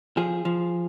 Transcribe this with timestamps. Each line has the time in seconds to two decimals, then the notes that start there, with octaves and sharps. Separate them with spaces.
0.17 F3 G#4
0.45 F3